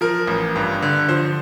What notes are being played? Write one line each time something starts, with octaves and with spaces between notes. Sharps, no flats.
F3 A#4
A1
G2
D3
F3 C5